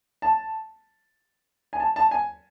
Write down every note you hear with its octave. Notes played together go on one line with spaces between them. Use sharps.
A5
G#5
A5
A5
G#5